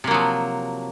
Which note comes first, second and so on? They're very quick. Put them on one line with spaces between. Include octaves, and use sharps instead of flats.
C3 A#3 F#3 F3